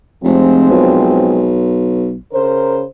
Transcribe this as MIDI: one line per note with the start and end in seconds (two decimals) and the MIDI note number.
0.24 0.67 29
0.24 1.60 53
0.24 1.60 56
0.24 1.60 60
0.70 2.18 35
2.34 2.84 49
2.34 2.84 70
2.34 2.84 72